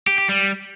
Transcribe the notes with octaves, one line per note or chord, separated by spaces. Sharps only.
G4
G4
G3